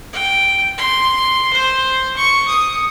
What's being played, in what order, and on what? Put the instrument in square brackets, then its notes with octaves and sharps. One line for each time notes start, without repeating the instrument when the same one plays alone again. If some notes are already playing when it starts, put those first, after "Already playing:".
[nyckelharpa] G5
C6
C5
C#6
D#6